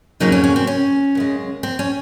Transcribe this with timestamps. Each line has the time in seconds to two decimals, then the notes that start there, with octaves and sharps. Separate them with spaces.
0.20 F2 C#3 F#3 A#3 D#4
0.32 C#4
0.44 C#4
0.56 C4
0.67 C#4
1.15 F#2 C#3 G#3
1.63 C4
1.79 C#4